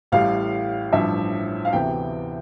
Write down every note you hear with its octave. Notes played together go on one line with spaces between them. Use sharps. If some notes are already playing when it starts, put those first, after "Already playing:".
A1 A2 G3 F5
A1 G2 F3 E5
F5
D2 C3 E3 B3 G5